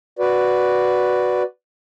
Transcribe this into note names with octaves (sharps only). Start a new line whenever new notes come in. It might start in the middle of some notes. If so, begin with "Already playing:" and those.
F#4 B4 D5